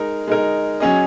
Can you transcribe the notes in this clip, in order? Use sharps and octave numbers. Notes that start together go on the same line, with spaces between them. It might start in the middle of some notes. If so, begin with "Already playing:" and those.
Already playing: G#3 D#4 A#4
G#3 D#4 A#4
F#3 C#4 G#4 D#5